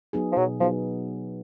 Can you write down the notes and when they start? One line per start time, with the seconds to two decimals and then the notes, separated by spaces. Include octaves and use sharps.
0.13 F#3 B3 D#4 G#4
0.32 F3
0.37 B2 F#3
0.60 F3 F#3 B3 D#4 G#4